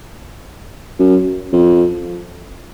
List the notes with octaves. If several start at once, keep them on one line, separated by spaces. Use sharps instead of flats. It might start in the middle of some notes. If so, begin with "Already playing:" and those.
F#2
F2